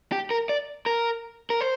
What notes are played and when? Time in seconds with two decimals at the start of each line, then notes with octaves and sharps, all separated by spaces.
0.12 G4
0.31 A#4
0.49 D5
0.86 A#4
1.50 A#4
1.61 C5